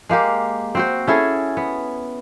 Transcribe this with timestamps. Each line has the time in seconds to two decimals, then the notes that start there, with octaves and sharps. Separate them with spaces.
0.09 G#3 A#3 G4 A#4
0.75 C4 F#4 C5
1.08 C#4 E4 G#4 A4
1.57 B3